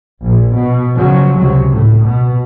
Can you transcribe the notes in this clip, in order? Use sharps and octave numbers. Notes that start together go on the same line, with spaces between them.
A#1
B2
C#3 F3 F#3
C#2 C3 F#3
A2
B2